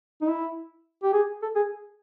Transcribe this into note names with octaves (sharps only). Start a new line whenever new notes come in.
D#4
E4
G4
G#4
A4
G#4